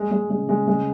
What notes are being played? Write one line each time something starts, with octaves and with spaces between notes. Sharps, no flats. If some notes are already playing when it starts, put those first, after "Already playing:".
Already playing: G#3
G#3
C#3 G#3
G#3
G#3